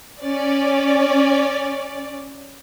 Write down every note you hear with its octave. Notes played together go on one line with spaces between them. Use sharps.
C#4 D5